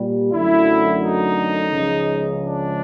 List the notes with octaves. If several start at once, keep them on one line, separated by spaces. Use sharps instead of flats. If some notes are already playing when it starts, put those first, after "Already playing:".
Already playing: A#2 G3
F#2 D3 F#3 A3 E4
D#4
C#2 C#3 F3 G#3
D4